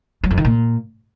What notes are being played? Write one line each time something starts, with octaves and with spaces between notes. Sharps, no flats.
F#3
F2
D#3
A#2